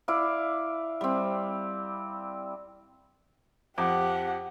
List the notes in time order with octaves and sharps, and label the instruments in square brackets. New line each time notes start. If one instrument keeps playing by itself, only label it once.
[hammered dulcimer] E4 D5 F5
G3 C4
[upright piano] F2 D6 [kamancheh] G4 F#5